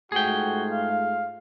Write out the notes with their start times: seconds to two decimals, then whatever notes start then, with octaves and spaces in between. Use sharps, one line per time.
0.12 G#2 A3 F4 F#4 G#4 G5
0.71 F5